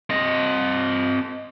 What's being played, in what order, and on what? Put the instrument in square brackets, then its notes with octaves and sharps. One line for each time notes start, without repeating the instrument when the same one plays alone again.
[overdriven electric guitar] C4 D#5